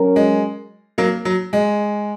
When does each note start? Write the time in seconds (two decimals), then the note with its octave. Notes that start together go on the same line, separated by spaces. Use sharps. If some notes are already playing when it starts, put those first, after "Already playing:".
Already playing: F#3 C#4 A#4
0.16 G#3
0.98 F#3 A#3
1.25 F#3
1.53 G#3